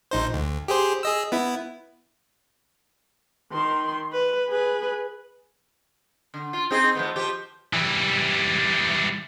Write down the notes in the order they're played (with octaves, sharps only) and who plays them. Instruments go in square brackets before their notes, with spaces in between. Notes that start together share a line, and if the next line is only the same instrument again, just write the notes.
[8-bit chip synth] A#1 D#4 C5
D2
G4 G#4 C5
G#4 D#5 E6
B3 E4
[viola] D#3 C6
B4
G#4 B4
[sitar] D3
F4
C4 D#4 G#4
F3 A3 B3
F3 G4
[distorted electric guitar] E3 G3